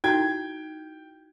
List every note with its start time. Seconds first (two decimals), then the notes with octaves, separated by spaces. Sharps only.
0.04 D#4 E4 F#4 G5 G#6